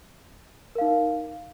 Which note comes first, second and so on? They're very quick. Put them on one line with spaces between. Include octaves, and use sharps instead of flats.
A#4 F5 D#4